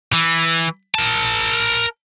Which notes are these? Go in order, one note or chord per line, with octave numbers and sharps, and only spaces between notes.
E3
A#4 A5